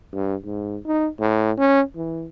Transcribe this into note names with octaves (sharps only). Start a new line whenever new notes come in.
G2
G#2
D#4
A2
C#4
E3